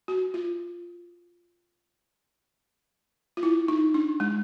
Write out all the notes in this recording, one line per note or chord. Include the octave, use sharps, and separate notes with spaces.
F#4
F4
F4
E4
D#4
D4
G#3